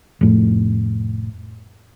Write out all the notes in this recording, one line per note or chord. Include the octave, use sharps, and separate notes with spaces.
F1 A2